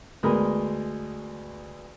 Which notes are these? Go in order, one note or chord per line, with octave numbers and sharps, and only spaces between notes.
D2 G#3 B3 A#4 B5 D#6